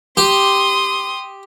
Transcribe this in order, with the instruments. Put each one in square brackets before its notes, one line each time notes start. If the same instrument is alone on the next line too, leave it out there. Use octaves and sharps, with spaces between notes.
[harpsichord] G4 [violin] C6 D#6